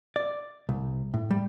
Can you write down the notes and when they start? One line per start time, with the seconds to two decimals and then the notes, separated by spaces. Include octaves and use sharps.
0.16 D5
0.69 C2
1.14 A2
1.31 G3